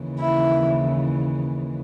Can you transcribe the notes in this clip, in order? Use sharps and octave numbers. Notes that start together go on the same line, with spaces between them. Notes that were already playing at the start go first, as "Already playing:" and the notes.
Already playing: D#2 C#3 E3
E4